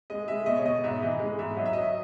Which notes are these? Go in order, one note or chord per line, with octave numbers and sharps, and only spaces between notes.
G#3 D#5
G#3 E5
B2 D#5
C#5
B2 D#5
G#2 E5
E3 D#5
G#3
G#2 E5
F#3 D#5
E5
F#3 D#5